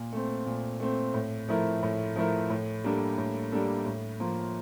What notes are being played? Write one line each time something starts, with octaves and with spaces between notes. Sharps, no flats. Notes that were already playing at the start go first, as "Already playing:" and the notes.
Already playing: A#2
A3 C4
A#2
A3 C4
A2
F3 A3 E4 A#4
A2
F3 A3 E4 A#4
A2
G3 A#3 D4 A4
A2
G3 A#3 D4 A4
A2
F3 A#3 F4